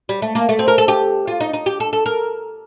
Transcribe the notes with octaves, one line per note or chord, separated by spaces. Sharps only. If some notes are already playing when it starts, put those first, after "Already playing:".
G3
A3
A#3
A3
C4
A#4
A4
G4
F4
D#4
D#4
G4
A4
A4
A#4